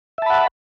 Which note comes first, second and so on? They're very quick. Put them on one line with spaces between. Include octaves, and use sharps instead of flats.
E5 A5 B5 F#5